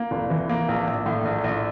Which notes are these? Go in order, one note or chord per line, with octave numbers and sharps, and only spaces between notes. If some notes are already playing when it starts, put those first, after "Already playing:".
Already playing: A#3
F1
E3
A#3
A#1
A#1
A2
A#1
A#1